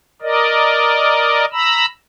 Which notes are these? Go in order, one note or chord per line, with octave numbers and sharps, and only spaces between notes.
A#4 D5 D#5
A#5 B5 E6